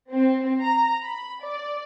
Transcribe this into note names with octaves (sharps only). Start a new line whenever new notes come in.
C4
A#5
B5
D5